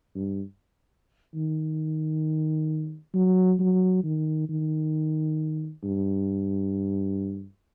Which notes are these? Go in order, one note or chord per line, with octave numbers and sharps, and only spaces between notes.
G2
D#3
F#3
F#3
D#3
D#3
G2